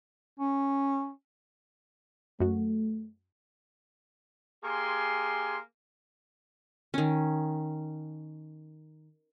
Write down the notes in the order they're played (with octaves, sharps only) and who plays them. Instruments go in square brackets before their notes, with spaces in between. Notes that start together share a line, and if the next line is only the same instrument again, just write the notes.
[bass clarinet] C#4
[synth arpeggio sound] F#2 F#4 [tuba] A3
[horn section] A#3 G4 G#4 G#5 C6
[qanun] D#3 C#4